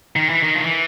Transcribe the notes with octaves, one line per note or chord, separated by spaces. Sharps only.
D#3
E3
D#3
F3
E3